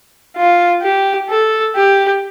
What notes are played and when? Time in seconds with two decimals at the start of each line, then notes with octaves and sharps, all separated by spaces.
0.37 F4
0.82 G4
1.29 A4
1.76 G4